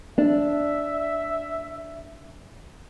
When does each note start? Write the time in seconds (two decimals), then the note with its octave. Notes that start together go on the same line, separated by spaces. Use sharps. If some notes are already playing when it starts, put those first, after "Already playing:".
0.18 D4 E5